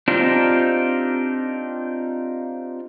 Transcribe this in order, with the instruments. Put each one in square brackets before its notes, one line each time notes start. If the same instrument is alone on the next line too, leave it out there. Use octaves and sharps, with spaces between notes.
[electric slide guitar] C4 D4 D#4 F4 G4